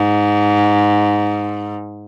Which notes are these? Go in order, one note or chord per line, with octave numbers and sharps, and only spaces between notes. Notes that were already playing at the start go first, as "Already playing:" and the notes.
Already playing: G#2